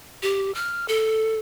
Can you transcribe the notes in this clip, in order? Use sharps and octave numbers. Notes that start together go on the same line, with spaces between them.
G4
F6
A4